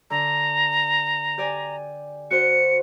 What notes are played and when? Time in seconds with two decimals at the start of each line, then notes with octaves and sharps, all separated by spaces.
0.10 D3 A#5
1.38 G4 D5 G#5
2.31 F#4 C5 C#7